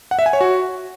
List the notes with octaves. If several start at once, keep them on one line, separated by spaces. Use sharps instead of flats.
F#5
E5
G#5
C#5
F#4